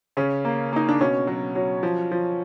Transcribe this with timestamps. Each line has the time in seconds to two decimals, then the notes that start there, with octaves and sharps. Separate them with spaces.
0.17 C#3 C#4
0.45 A#3
0.73 A#3 D#4
0.89 D4
1.00 B2 C#4
1.27 F#3
1.55 F#3
1.83 F3
2.11 F3